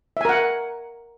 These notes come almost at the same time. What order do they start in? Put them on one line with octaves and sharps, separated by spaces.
E5 G#5 A#4 F#5